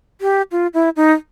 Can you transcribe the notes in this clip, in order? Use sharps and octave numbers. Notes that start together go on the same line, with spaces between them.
G4
F4
E4
D#4